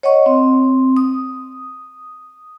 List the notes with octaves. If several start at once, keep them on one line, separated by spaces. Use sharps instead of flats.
C#5 D#5 F#5 C#6
C4
D#6